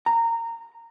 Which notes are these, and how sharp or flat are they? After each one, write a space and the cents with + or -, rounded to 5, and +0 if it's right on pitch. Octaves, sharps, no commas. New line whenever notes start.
A#5 -20